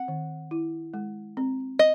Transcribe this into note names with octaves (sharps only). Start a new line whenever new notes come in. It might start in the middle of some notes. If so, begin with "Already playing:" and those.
Already playing: C4 F#5
D#3
E4
G#3
C4
D#5